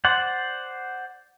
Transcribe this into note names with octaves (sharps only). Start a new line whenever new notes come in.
C5 D5 F#5